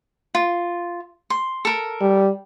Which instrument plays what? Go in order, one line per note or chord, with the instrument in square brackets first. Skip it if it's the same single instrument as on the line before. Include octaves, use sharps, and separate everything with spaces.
[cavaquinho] F4
C6
A4 A#4
[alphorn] G3